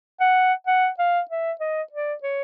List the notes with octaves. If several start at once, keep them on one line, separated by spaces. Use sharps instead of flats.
F#5
F#5
F5
E5
D#5
D5
C#5